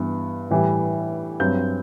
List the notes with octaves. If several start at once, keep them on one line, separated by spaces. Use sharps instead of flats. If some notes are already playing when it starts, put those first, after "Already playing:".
Already playing: G2 E3 B3
A2 E3 G3
G2 F#3 C4 G6